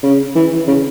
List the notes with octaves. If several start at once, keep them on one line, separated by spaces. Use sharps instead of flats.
C#3
E3
C#3